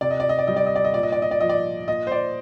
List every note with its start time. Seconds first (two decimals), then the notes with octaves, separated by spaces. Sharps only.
0.01 C3 D5
0.11 D#5
0.20 D5
0.29 D#5
0.39 D5
0.47 G3 D#5
0.56 D5
0.67 D#5
0.76 D5
0.85 D#5
0.94 A#2 D5
1.03 D#5
1.12 D5
1.22 D#5
1.31 D5
1.41 F3 D#5
1.49 D5
1.88 A#2 D#5
2.07 C5
2.12 D5